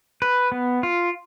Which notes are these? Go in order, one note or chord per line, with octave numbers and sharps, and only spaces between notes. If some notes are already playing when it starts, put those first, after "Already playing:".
B4
B3
F4